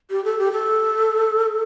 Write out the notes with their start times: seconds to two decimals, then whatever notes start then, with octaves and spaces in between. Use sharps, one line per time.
0.11 G4
0.25 A4
0.39 G4
0.52 A4